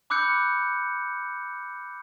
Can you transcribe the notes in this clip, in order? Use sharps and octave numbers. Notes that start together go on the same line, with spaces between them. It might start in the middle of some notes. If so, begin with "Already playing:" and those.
B5 D6 E6 F#6 G6 C#7